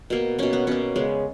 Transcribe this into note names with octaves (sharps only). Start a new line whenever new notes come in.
B2 A#3
B2 A#3 C#4
B3
B2 A#3 C#4
C#3 G#3 B3